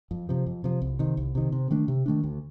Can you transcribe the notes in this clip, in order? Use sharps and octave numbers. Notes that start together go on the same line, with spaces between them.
F2
C3 F3
F2
C3 F3
C2
C3 D#3
C2
C3 D#3
C3
D#3 A3 D4
C3
D#3 A3 D4
D2